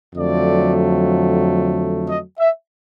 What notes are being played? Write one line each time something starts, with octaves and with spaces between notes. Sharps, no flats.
F2 D3 F#3 A3 D5
D#5
E5